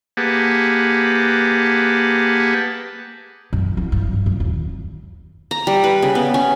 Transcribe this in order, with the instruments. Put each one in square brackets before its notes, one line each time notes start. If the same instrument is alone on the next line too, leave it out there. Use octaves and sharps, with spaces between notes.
[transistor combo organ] A#3 G4 G#4 B4 F#5 A5
[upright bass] F#2
E3
G2
F2
F#2
D#2
[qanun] A#5
G3
B4
C#3
B3
C#4